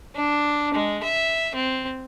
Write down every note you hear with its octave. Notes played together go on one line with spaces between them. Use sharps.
D4
G#3
E5
C4